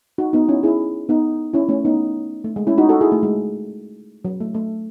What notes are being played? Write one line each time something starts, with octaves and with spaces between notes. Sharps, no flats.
D#4 F#4
B3 D#4
C#4 E4
E4 G#4
B3 D#4
C#4 E4
A3 C#4
B3 D#4
A3
G#3
C#4 E4
D#4 F#4
F#4 A4
E4 G#4
A3
G#3
F#3
A3
A3